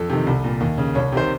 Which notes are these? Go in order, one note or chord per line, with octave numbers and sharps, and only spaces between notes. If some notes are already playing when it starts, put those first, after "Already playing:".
Already playing: F2 A4
C3 D#3
C2
A#2
D#2
C#3
C2 C#5
C3 D#3 C5